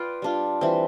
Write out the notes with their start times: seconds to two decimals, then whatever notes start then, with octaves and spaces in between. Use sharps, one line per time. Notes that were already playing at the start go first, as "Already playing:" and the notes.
Already playing: F4 B4 D5 F5 G5
0.22 G3 D4 F4
0.61 E3 G3 C4